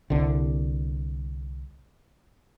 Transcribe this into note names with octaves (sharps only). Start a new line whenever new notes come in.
C2 D3